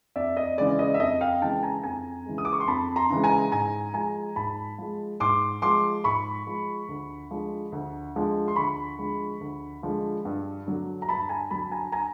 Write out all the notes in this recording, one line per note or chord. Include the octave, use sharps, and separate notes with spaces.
F2 D5 E5
D#5
C#3 E3 G#3 D5
D#5
E5
F2 D#5
F5 G5
C#3 E3 G#3 G5 A5
G#5 A#5
F2 G#5 A#5
C#3 E3 G#3
D#6
D6
C#6
C6
F2 A5 B5
A#5 C6
C#3 E3 G#3
G#5 A#5
G#2 G#5 A#5
F3 G#3 G#5 A#5
G#2 A5 B5
F3 G#3
G#2 C6 D6
F3 G#3 C6 D6
G#2 B5 C#6
F3 G#3
D2
D3 F3 G#3
D2
D3 F3 G#3
C6
D2 B5 C#6
D3 F3 G#3
D2
D3 F3 G#3
G2
D3 F#3
A#5
G2 A5 B5
G#5 A#5
D3 F#3 A5 B5
G#5 A#5
G#5 A#5